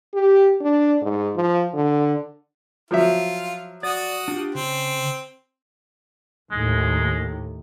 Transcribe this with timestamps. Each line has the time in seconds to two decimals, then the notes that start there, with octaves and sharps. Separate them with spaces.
0.14 G4
0.61 D4
1.01 G#2
1.35 F3
1.74 D3
2.91 F3 F#3 F4 E5
3.83 F#4 D5 D#6
4.28 D4 F4 G4
4.55 C#3 C4
6.51 D#2 A2 D#3 G#3